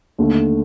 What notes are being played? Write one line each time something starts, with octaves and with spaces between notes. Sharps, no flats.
D#2 D3 A3